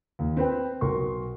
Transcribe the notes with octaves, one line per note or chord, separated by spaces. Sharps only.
D#2
C4 B4 G5
B1 A#4 C6 C#6